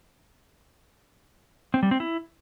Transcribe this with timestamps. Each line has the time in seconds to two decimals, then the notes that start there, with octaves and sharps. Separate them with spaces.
1.74 C4
1.83 G3
1.91 C4
2.00 E4